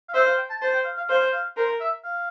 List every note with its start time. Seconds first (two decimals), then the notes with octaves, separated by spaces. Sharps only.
0.09 F5
0.14 C5 E5
0.26 F5
0.38 G5
0.50 A5
0.61 C5 A5
0.74 G5
0.85 F5
0.98 F5
1.09 C5 F5
1.33 F5
1.57 A#4 C5
1.80 E5
2.04 F5